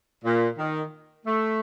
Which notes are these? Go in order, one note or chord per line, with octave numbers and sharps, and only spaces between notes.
A#2
D#3
A3